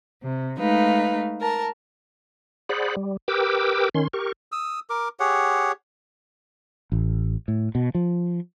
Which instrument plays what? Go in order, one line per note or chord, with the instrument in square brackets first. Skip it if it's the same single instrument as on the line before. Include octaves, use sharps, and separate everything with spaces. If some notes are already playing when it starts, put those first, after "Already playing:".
[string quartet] C3
G#3 A3 D#4 B4 F5
A#4 A5
[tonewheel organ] G#4 C5 D5 F#5 B5
G3
G4 A#4 B4 G5 D6 E6
D#3 C#4 C6
G4 A#4 C#6
[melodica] D#6 E6
A#4 D6
G4 G#4 C#5 F#5
[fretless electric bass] A1
A2
B2
F3